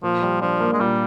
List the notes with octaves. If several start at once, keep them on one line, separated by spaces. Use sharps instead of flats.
A#2 F3
G3
F3 D4
A#3
G#3
A#2 G3